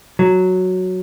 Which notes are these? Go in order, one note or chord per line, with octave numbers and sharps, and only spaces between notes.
F#3